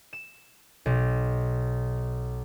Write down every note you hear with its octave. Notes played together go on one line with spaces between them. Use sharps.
E7
B1